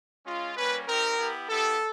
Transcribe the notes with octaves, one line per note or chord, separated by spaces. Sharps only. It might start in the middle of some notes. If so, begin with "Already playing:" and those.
G#3 C#4 F4
G3 A#3 C#4 B4
C4 D#4 G4 A#4
B3 E4 G4
B3 E4 G4 A4